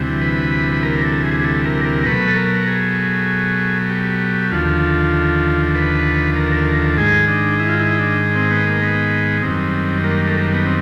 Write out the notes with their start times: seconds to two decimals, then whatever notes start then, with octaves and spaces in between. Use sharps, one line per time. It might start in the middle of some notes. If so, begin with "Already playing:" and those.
Already playing: D2 C3 E3 G3
0.21 B4
0.72 B4
0.83 A#4
1.04 A4
1.24 G#4
1.40 G#4
1.44 A4
1.65 A#4
1.85 A#4
2.06 B2 F#3 A3 B4
2.28 A4
2.36 A#4
2.67 G#4
3.90 G4
4.51 D#2 D3 F3 A3 F4
5.75 B4
6.36 A#4
6.56 A#4
6.97 G#2 D#3 G#3 G#4
7.28 D4
7.59 E4
7.69 F4
7.79 E4
7.99 D4
8.35 C4
8.51 B3
8.67 A#3
8.82 B3
9.43 F#2 D#3 G3 C4
10.04 A#3
10.27 A3
10.40 A#3
10.53 B3
10.66 C4